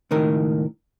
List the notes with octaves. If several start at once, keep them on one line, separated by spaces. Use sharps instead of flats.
C#2 A2 D#3 A#4